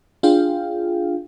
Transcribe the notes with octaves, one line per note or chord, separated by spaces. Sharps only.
D4 F4 G#4 F5 G5